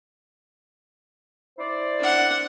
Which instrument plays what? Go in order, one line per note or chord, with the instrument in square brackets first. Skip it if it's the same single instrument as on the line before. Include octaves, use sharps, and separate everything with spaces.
[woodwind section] E4 C5 D5
[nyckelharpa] D4 F#5